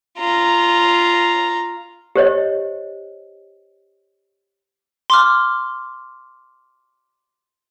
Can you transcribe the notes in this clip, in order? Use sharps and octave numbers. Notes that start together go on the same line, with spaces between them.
F4 A#5
G4 C5 C#5 D#5
C6 D6 F6